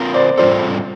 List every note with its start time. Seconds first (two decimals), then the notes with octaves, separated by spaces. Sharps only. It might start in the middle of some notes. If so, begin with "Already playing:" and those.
Already playing: C4 F4 A#4
0.14 C5 D5
0.37 G3 C4 F4 A4 C5 D5